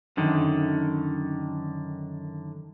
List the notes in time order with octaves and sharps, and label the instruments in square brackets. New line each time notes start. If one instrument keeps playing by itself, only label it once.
[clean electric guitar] F#2 D3 D#3